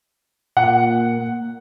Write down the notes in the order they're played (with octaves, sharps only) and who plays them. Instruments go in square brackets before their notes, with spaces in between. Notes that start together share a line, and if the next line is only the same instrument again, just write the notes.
[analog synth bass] A#2 [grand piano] F#5